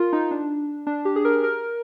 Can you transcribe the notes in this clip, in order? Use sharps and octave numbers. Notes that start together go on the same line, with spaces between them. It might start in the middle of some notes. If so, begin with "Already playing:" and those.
Already playing: F4 A#4
D#4
D4
D4
G4
G#4
A#4
A#4